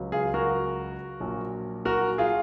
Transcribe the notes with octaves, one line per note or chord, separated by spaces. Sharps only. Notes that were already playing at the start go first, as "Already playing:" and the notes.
Already playing: C#2 C#3 F#3
F4 G#4
F#4 A#4
A#1 A#2 F#3
F#4 A#4
F4 G#4